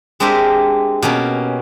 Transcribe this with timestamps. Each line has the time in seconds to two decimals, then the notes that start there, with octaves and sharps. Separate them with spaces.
0.20 G#3 C4 D4 G4 A#4 E5
1.02 B2 A#3 C#4